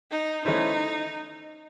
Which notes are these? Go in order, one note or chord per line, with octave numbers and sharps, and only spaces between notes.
D#4
E3 A3 C#4 D#4 E4 C5